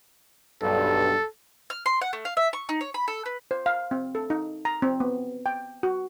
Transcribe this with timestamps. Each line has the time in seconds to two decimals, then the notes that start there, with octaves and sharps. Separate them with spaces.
0.62 B1 G2 A4
1.70 F6
1.86 C6
2.01 F#5
2.13 A3
2.25 F5
2.37 E5
2.53 C#6
2.69 D#4
2.81 C#5
2.94 B5
3.08 A4
3.26 B4
3.51 C5
3.66 F5
3.91 C4
4.15 A4
4.30 D#4
4.65 A#5
4.82 C4
5.00 B3
5.46 G5
5.83 F#4